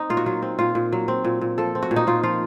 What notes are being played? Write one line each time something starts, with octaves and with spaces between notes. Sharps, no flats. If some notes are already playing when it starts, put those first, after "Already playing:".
Already playing: C4 D#4
A#2 F4
F#4
F#3 F4
C4
A#2 F4
A#2
F#3
C4
A#2
A#2
F3 A4
C4
F#4
A#2
D#4
A#2 F4
F3 F4